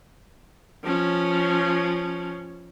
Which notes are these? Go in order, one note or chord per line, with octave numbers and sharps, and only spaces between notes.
F3 C#4